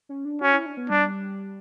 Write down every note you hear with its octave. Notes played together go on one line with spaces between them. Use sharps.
C#4
D4
C#4 F#4
E4
D4
B3
G3 D4